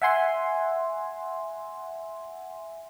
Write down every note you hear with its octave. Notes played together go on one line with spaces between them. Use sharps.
E5 F#5 G#5 C6